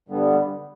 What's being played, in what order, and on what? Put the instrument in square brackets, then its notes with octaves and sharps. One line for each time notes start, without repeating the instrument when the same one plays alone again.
[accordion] G2 D3 G3 B3